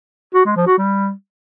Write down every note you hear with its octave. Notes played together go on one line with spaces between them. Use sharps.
F#4
G#3
F3
F#4
G3